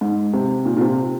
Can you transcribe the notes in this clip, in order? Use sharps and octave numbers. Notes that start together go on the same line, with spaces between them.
G#2
C3
A#2
A#2
C3